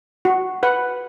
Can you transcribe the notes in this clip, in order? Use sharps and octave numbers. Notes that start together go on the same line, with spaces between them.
F#4
B4 F#5